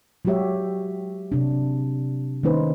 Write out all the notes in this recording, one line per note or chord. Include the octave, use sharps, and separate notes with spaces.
F#3 G#3 F#4 G4 C#5 E5
C3 D4
D#3 A#3 C#4 D#4 B4 C5